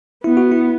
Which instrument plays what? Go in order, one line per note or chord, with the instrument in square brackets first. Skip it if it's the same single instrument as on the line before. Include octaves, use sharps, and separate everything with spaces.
[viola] B3 [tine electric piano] E4
[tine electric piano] F#4
E4